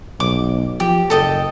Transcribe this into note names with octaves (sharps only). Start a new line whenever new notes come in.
B1 D6
F3 G4
F#1 A4 D#5 G5